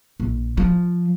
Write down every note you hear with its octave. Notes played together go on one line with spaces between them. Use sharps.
A#1
F3